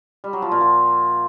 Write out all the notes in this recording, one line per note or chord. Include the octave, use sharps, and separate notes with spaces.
G3
F#3
F3
A#2
F3